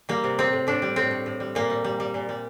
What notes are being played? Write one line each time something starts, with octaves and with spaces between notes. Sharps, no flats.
G3 A#3
C3
A2 C4
A2
A2 D4
G3
A2 C4
A2
A2
G3
A#2 A#3
G3
G3
G3
A#2
G3